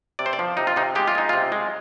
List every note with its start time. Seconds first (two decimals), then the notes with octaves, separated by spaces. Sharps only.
0.19 C3 D5
0.26 C5
0.33 D5
0.39 F3
0.57 C3 D#4
0.67 F4
0.76 C3 D#4
0.95 G#3 G4
1.08 F4
1.15 G#3 D#4
1.29 C3 F4
1.52 G#3